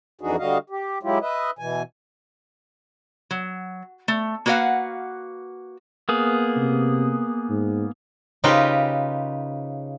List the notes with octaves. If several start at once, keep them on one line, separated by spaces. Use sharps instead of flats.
F2 E3 D4 D#4 F#4 G#4
D3 G3 F#4 D#5 F5
G4
F#3 G#3 E4 F4 G4
B4 D#5 E5
B2 E3 G#5
F#3
A3
A#3 F#4 B4 D5 F5 F#5
A#3 B3 G#4
C3
G#2
C#3 D#4 F4 G4 B4 C5